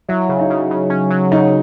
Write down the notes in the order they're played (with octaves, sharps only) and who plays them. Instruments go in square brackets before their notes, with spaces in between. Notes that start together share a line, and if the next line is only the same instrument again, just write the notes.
[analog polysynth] F#3 [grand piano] E4
[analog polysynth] C#3
[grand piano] D#4
[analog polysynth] C#3
C#3
C#4
F#3
[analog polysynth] C#3 [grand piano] D#4